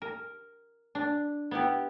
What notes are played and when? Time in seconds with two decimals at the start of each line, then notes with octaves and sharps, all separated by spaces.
0.02 A#4
0.95 D4
1.51 B3 E4 G4